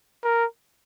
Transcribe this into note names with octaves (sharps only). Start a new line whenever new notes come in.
A#4